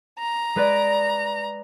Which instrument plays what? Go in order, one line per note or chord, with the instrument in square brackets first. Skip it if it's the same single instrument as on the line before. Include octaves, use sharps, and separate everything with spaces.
[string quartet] A#5
[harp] G#3 B4 D5